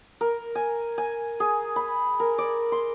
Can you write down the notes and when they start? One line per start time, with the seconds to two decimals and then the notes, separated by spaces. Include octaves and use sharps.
0.21 A#4
0.55 G#5
0.98 G#5
1.40 G#4
1.76 B5
2.20 A#4
2.38 D5
2.72 C6